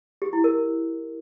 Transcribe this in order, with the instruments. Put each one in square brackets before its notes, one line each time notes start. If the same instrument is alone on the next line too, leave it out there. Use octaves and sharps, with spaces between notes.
[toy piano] G4
E4
A#4